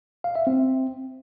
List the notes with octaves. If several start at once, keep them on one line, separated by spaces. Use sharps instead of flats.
F5
E5
C4